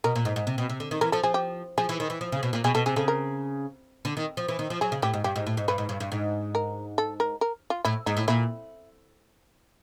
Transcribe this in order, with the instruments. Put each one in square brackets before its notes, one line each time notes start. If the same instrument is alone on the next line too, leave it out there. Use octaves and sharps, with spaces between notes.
[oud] B2 [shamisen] A#4
[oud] A#2
G#2
G#2
C3
B2
C3
D3
D#3
[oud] E3 [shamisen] A#4
[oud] F3 [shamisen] A4
[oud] F3 [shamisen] G#4
[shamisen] G4
[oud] F3 [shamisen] G#4
[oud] E3
D#3
E3
F3
C#3
B2
A#2
[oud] B2 [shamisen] G#4
[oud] B2 [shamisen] A4
[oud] C3 [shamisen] G#4
[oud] C#3 [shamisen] A4
[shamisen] A#4
[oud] D3
D#3
F3
E3
D#3
F3
[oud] F#3 [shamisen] G#4
[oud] C#3
[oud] A2 [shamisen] G4
[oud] G#2
[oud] G2 [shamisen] G4
[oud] G#2
A2
G#2
[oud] G2 [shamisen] B4
[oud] G#2
G2
G2
G#2
[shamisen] A#4
A4
A#4
A#4
F4
[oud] A2 [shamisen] E4
[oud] G#2 [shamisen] D#4
[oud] A2
[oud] A#2 [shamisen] E4